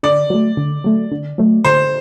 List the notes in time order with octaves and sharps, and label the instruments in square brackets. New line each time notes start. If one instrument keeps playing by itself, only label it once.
[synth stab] D3 [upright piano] D5
[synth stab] F#3 A3
D3
F#3 A3
D3
F#3 A3
[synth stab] D3 [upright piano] C5